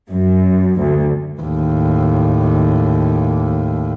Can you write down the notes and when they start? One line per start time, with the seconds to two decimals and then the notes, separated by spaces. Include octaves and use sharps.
0.10 F#2
0.79 D2
1.42 D#2 A2